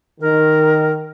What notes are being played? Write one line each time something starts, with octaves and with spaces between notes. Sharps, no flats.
D#3 A#4